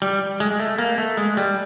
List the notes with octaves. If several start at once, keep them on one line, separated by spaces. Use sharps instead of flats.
G3
G#3
G#3
A3
A#3
A3
G#3
G3